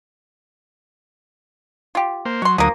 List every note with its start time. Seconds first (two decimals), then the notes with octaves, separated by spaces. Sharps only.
1.95 F4 G4
2.25 A#3 C5
2.42 F#3 C#5 C6
2.58 D2 F3 F#3 A#3 D#6